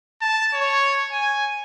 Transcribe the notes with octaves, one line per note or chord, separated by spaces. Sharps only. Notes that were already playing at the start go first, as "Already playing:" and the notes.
A5
C#5
G#5